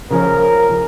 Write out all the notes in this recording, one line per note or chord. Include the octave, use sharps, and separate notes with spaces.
C#3 F3 C#4 A#4